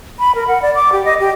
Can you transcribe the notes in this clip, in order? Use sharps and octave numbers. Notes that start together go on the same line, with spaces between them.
B5
A#4
F#5
D5
D6
G4
D#5
G4